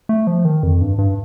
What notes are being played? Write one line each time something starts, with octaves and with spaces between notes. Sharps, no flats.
A3
F3
D#3
F2
G2
G2